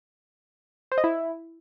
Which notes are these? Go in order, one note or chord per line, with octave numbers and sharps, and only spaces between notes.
C5
D#5
E4